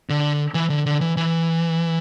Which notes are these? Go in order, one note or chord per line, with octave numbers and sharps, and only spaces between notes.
D3
E3
D3
D3
E3
E3